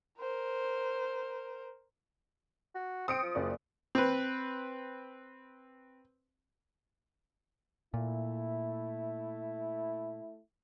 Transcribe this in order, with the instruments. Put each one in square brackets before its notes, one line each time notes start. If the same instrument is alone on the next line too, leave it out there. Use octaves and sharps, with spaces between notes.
[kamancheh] A#4 C5
[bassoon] F#4
[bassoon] C4 [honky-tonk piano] D#6 C#7 D7
[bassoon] F3
[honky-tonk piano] F#1 D5
[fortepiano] C4 B4
[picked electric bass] A#2 [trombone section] A3 E4